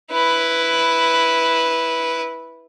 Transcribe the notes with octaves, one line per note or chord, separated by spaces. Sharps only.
E4 B4